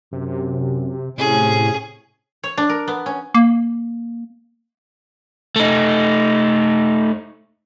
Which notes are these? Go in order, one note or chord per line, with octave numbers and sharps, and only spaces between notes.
F#2 C3
A2 C3 C#4 G#4
C#5
D4
A#4
B3
C#4
A#3
A3 D#4